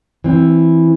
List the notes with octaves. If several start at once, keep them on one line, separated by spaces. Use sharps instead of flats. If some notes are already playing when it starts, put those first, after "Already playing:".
E3 C4